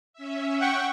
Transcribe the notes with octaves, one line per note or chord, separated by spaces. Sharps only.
C#4 E5
F#5 G5 C#6